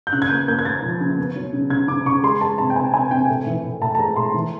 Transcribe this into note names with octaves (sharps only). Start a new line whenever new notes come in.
G6
C#3 F#6
G#6
A#3 G6
A#3 G6
G#6
A#3 A6
F3
C#3
B3
F#3
C#3
C#3 G#6
C#3 D6
C#3 C#6
G#3 C6
G#3 A5
C3 A5
G5
C3 G#5
C3 G#5
C3 G5
A2
E3
A2
A2 A5
A5
G#3 A#5
A2 C6
E3